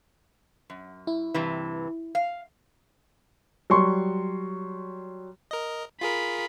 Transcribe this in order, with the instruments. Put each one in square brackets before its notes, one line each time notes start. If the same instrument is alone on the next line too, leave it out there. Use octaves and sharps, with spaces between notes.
[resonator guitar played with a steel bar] F#2
[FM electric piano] E4
[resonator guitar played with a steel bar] G2 C3 E3
F5
[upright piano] F#3 G3 C6 C#6
[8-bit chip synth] A#4 D#5
[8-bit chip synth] F4 G#4 A#4 [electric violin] B5